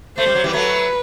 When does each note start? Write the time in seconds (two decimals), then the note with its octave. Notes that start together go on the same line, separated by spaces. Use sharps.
0.17 A3 C5
0.26 G3
0.35 F#3
0.44 E3 G3
0.53 F#3 A3 B4